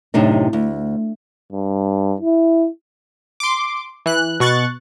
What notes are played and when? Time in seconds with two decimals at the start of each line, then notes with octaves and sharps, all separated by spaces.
0.14 F#2 A2 C3 D4 D#4
0.53 D2
1.53 G2
2.21 E4
3.40 C6 D6
4.06 E3 F#6
4.40 B2 C#6 F#6 A6